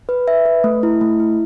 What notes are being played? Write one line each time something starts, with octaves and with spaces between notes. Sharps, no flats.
B4
E5
B4
A3
E4
A3
E4